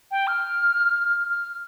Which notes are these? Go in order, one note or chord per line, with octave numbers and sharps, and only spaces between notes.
G5
F6
F6